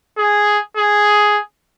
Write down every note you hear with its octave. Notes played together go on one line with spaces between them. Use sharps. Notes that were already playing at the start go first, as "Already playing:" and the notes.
G#4
G#4